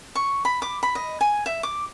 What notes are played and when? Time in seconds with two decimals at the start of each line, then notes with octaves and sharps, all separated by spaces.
0.15 C#6
0.45 B5
0.62 D6
0.83 B5
0.95 D#5
1.21 G#5
1.46 E5
1.63 D6